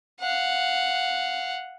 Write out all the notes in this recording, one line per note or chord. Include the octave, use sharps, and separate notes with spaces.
F5 F#5